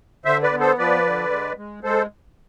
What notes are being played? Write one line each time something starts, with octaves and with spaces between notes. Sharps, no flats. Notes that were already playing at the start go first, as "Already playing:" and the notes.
D3 C5 E5
B4 D5
B3
A4 C5
F3 B4 D5
D3
G#3
G#3
G#3 A4 C5